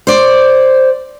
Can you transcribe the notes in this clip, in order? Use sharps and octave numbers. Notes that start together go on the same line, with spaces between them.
C5 D5